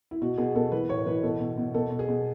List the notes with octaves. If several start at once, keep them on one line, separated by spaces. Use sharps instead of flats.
E4
B2 F#4
B2 G#4
B2 A4
E3 B4
A2 C#5
E3 B4
B2 A4
B2
B2
B2 A4
B2
G#4
B2